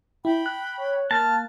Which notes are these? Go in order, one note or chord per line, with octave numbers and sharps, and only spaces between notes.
E4 G5 B5
F#6
C#5
A#3 A5 F6